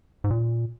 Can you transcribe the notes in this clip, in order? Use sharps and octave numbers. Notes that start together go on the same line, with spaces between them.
G#2
A#2